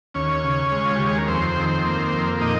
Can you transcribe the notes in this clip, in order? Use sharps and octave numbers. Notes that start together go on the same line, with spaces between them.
D#2 C#4 C#5
C#3
G#3
F4
D#2 G4
G#4
A#4
F2 C4 C5
D#3
A#3
F2
A#2 D#4 D#5